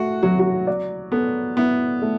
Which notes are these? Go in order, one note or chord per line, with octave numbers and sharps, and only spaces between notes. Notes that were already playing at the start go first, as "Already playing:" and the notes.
Already playing: A3 F#4
F#3 F#4
F#4
D5
B3 A4
B3 E4
A3